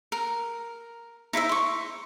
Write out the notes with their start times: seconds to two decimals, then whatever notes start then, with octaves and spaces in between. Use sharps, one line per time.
0.12 A#4
1.33 D#4 E4 C5 E5
1.49 C6 C#6